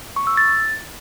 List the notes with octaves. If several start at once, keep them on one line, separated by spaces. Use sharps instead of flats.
C#6
E6
A6